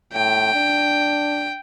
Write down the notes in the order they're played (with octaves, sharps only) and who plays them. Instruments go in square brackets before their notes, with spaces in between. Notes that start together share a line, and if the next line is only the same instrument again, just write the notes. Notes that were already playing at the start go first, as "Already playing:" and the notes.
[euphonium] A2 [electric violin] G5
[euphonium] D4